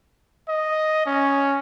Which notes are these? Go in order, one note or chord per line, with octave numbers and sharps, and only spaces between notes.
D#5
C#4